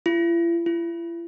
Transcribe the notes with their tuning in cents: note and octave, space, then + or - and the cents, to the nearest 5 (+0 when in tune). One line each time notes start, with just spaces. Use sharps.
E4 +45
E4 +40